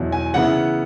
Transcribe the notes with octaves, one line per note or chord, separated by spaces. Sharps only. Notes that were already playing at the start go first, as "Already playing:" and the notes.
Already playing: E2 B2 F#3 E4
G#5
C#3 E3 B3 E4 F#5